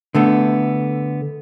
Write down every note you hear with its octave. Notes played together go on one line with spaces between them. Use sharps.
D3 A3 B3